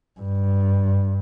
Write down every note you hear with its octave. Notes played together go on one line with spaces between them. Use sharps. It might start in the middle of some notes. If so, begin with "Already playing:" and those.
G2